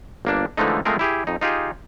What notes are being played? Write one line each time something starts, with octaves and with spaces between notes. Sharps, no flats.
G1 A#3 D4
D3 E3 F3 G#3 A3 D#4
F3 G#3 A3 C4 G#4 A#4
E4 G4 G#4
F2 D#4
D#4 F4 G4 G#4